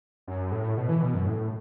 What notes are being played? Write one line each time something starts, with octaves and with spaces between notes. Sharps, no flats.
F#2
A2
B2
E3
B2
F#2
A2